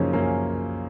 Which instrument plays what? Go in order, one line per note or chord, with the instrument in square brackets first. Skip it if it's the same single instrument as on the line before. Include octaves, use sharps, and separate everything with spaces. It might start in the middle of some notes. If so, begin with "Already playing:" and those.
Already playing: [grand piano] F#2 C#3 F3 A#3 C#4 D#4
F#2 A#3 C#4